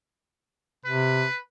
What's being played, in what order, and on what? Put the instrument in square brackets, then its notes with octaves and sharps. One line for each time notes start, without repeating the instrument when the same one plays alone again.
[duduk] C3 [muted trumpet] B4